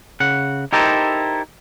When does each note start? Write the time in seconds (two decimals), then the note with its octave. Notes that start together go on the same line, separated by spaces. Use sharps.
0.20 C#3 F#5
0.73 D#4 E4 G4 A4 A#4 C5